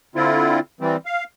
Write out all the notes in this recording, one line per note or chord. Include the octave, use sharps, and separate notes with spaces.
D3 C4 E4 F4
E3 G3 C4
F5